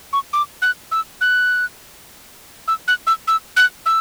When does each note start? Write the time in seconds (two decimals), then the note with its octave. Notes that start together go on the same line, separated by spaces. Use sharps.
0.13 C#6
0.33 D6
0.62 F#6
0.92 E6
1.21 F#6
2.68 E6
2.88 F#6
3.07 E6
3.28 E6
3.57 F#6
3.86 E6